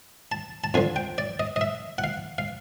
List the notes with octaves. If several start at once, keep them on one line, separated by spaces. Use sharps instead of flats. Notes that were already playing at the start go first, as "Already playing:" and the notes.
A5
A5
F2 D3 F3 G#5
G5
D5
D#5
D#5
E5
F#5
F5
F5